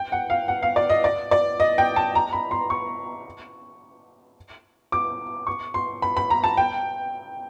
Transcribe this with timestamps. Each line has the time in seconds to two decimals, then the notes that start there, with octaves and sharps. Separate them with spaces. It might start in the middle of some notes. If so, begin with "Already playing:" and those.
Already playing: G5
0.12 F#5
0.30 F5
0.48 F#5
0.63 F5
0.76 D5
0.89 D#5
1.04 D5
1.31 D5
1.60 D#5
1.78 G5
1.96 A5
2.15 A#5
2.33 B5
2.51 C6
2.70 C#6
4.92 D6
5.47 C#6
5.74 C6
6.02 B5
6.17 B5
6.30 A#5
6.44 A5
6.57 G5